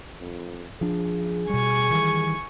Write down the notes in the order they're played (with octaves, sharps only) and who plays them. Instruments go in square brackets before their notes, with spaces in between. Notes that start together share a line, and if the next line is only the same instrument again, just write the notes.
[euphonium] F2
[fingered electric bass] F3 D4 [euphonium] G#4
[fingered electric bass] B2 G3 [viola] G#5 C#6
[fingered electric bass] D#3 E3 G3